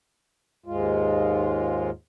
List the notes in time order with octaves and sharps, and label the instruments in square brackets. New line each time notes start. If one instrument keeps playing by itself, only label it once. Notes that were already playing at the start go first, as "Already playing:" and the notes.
[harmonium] D#2 G#2 G#3 F4